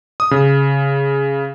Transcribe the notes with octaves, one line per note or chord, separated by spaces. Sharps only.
D#6
C#3